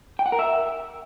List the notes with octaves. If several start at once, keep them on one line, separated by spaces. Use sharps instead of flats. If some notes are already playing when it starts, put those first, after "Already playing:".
G5
F#5
A#4
E5